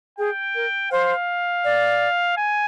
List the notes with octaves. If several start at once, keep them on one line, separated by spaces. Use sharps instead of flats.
G#4 G5
A#4
C5 F5
D5
G#5